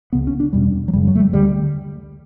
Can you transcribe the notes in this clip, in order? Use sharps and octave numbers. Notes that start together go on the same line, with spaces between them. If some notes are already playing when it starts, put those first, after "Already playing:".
C#2 C#3 B3
C#4
D4
E2 B2 G3
F#3
F#2 C#3 G3
F#3
A3
G3
D2 D3 G3